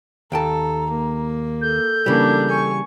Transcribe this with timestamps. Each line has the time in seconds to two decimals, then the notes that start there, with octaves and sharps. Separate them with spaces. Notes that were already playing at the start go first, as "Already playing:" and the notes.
0.32 D#2 A4 G5 A5 A#5
0.91 A#3
1.61 A4 G6
2.06 C#3 E3 G3 A#3 D4
2.50 G#5 C#6